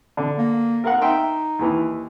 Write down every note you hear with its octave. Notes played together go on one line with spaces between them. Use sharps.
D3
A#3
A#4 F5 F#5
D#4 E5 G5 C6
D#2 E3